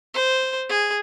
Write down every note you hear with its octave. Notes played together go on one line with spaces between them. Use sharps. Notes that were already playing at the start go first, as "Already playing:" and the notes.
C5
G#4